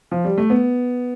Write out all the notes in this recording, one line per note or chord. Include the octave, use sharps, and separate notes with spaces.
F3
G3
A3
B3